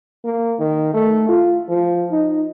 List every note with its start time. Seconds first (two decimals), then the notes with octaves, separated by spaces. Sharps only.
0.24 A#3
0.59 D#3
0.94 A3
1.29 F4
1.69 F3
2.11 D#4